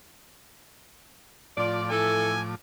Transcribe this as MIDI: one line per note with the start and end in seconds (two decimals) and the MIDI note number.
1.57 2.55 45
1.57 2.55 53
1.57 1.86 65
1.57 1.86 74
1.57 2.55 86
1.90 2.34 52
1.90 2.34 57
1.90 2.34 69
1.90 2.41 80